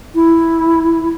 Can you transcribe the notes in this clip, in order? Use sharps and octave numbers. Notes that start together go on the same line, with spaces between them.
E4